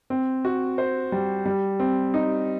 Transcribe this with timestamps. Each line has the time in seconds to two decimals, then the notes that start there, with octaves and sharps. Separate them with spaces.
0.10 C4
0.45 F#4
0.78 C5
1.12 G3
1.46 G3
1.80 C4
2.14 D#4